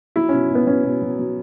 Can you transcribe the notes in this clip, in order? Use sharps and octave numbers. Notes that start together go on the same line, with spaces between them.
F#3 E4
B2 C#4
B2 B3
F#3 C#4
B2
F#3
F#3